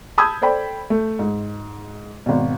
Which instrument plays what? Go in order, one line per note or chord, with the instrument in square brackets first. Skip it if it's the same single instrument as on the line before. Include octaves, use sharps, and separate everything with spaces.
[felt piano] A5 B5 D#6 E6 G6 G#6
A4 C5 D5 G5 B5
A3
G#2
G#1 B2